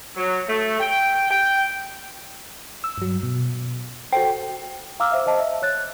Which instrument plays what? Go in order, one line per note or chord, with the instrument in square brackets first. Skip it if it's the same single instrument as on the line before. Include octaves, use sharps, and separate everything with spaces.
[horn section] F#3
A3
G5
G5
[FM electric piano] E6
G2 F#3
B2
[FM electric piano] F#4 A4 C5 [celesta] G5
[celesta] F5 A#5 D6 E6 F6
C5 E5
C5 D#5 A5
E5
C#5 F#6 A6